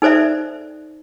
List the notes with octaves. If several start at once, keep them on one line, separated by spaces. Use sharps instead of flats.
D#4 A4 C5 D5 E5